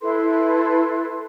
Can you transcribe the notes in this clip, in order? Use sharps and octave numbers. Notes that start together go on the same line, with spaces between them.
E4 A4 B4 C6